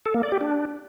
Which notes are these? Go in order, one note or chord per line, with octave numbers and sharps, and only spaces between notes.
A4
A#3
D5
G4
D4